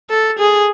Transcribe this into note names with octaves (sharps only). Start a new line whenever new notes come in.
A4
G#4